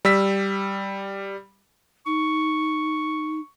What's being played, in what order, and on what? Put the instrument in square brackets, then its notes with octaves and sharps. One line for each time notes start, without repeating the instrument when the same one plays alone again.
[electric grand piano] G3 E6 B6
[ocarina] D#4 [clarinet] C#6